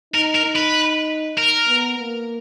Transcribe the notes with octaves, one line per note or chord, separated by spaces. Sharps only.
D#4 A#4
A#4
D#4
B4
A#4
B3
A#3